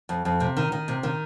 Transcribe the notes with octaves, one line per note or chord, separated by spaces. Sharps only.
F2
F2
C3
D#3
D#3
C3
D#3